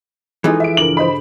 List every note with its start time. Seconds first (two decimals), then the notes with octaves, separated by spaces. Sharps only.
0.44 E3 F3 G#3 D#4 G#4 A4 G#5
0.60 E5 D7
0.77 G2 C#3 D4 A#4 F#7
0.97 C5 D#5 B5